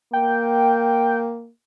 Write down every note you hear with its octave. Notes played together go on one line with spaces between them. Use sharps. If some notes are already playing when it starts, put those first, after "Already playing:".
A#3 G5